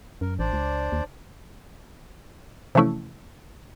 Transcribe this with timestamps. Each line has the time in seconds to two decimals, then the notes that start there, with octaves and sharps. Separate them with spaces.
0.21 F#2 A#4
0.39 A1 D4 C5 D5
0.53 C#2
0.92 D#2
2.75 C3 E3 F3 A3 C#4 E4